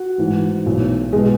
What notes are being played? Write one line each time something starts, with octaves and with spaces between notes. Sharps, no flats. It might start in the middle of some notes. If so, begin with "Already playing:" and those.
Already playing: F#4
A1 G#2 E3
B1 A2 E3
B2 G#3